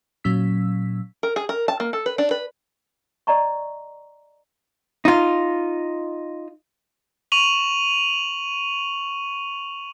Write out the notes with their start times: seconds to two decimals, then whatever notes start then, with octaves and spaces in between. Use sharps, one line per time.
0.24 A#2 F#3 C#4 E6 B6
1.23 A#4
1.36 G#4
1.49 A#4
1.68 A5
1.80 A#3
1.93 A4
2.06 B4
2.18 D4
2.31 B4
3.27 D5 D#5 A#5 C#6
5.05 D#4 F4
7.32 C#6 D#7 F7 F#7